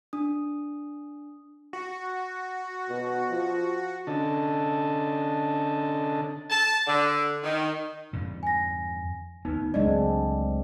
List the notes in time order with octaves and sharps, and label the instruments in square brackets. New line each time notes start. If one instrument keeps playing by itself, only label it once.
[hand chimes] D4 D#6
[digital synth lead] F#4
[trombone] B2
F3
[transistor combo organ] D3 C#4 D4 A4 D#5 A5
[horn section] A5
D3
D#3
[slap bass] F2 G#2 D3
[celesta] G#5 A#6
[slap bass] D2 B3 [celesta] D#4
[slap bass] C#2 F#3 A3 [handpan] G#3 C4 D4 [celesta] D5 D#5